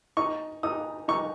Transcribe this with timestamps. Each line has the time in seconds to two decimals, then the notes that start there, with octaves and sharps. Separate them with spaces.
0.17 D#4 C#6
0.63 D#4 D#6
1.08 D#4 C#6